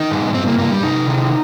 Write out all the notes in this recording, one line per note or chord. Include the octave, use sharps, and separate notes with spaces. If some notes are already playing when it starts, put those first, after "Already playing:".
Already playing: D#3 D#4
G2
G2 C4
A#3
G2 A#3
G3
C3 D#4
D#3